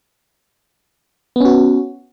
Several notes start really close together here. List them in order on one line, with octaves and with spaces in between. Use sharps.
B3 C#4 F#4